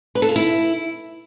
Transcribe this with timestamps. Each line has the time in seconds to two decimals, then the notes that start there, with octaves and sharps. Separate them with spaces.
0.15 B4
0.22 A4
0.29 F4
0.36 E4